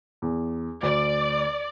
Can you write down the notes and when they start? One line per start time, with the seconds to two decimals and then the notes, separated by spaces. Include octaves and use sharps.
0.22 E2
0.83 D2 D5